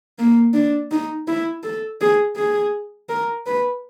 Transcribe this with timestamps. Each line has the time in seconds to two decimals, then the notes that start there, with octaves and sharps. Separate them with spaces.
0.19 A#3
0.54 D4
0.92 D#4
1.28 E4
1.63 A4
2.01 G#4
2.37 G#4
3.09 A#4
3.47 B4